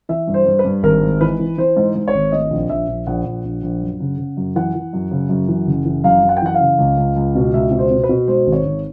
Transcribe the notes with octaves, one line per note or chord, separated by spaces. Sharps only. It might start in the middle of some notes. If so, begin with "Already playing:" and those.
E3 E5
G2
C5
G2
B4
G2
G#1 A#4
G#2
E3 B4
E3
E3 C5
G#2
G#2
C#5
G#1
A2 D#5
A#1
A#1 E5
A#1
A#1 F#5
A#1
A#1
A#1
F#2
C#3
C#3
F#2
E3 F#5
E3
F#2
C#3
F#2
E3
F#1
E3
F#2 F5
F#2
F#5
G5
E3 F#5
F5
C#3
C#2
C#2
C#2
B2
C#2 E5
B2
C5
B2
B4
B2
G#2 C5
G#1
C#5
G#1